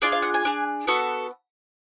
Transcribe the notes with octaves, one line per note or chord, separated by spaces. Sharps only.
D4 F4 G#4 D5
F5
F#5
G#5
D4 G#4
B3 F#4 A4